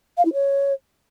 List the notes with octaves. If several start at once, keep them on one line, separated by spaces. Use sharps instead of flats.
F5
E4
C#5